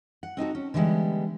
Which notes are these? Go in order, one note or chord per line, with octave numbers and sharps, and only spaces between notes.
F#5
C4 D#4 F#4 A4
C#4
D3 E3 F3 G3 G#3 B3